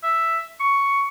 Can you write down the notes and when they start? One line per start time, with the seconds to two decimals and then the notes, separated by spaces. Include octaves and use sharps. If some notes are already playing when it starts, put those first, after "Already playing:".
0.03 E5
0.60 C#6